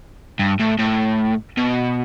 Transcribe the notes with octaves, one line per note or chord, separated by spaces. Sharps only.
G2
A2
A2
B2